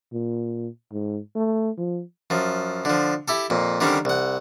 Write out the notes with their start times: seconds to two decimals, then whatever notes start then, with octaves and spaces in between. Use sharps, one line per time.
0.13 A#2
0.92 G#2
1.35 A3
1.78 F3
2.30 F#2 F3
2.85 D3 F3
3.28 E4 G4 A4
3.50 F2 A#2
3.80 D3 D#3 G3 C4 C#4
4.05 C2 F#5